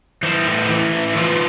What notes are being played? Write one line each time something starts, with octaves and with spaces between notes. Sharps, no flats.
E3 C5
A2
E3
A2
E3 F4